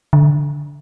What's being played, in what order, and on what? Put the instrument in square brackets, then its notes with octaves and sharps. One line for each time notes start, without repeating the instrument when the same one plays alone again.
[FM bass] D3